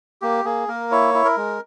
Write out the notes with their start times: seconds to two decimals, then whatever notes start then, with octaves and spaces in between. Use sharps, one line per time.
0.22 A#3 G4
0.45 A#3 G#4
0.68 A#3 A#4
0.91 E4 C#5
1.14 E4
1.25 A#4
1.37 G#3